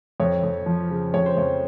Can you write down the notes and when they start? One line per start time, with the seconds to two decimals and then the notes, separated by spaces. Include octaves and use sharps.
0.20 F2 C#5
0.43 F2
0.66 F3
0.90 C#3
1.14 F2 C#5
1.26 C5
1.37 F2 C#5